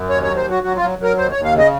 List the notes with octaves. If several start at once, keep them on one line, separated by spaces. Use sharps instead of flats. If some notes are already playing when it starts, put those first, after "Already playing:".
Already playing: F#2
D#2 C#5
F#3 C#5
C5
F#3 F#4
F#3 F#4
F4
F#3
F#3 A#4
D#2 C5
D#2 C#5
F5
C#3 D#5